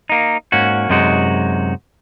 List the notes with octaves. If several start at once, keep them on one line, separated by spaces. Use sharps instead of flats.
A#3 D#4
G#2 A#3 C#4 F#4
F#2 C3 G#3 D#4 F#4